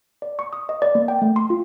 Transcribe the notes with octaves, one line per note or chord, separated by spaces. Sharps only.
D5
C#6
D#6
D#5
D5
A#3
G5
A3
C6
F4